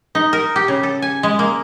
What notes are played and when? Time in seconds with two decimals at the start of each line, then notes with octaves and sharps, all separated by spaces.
0.15 D#4
0.33 A#4
0.56 G4
0.68 C#3
0.83 A4
1.02 G#5
1.23 G#3
1.39 A#3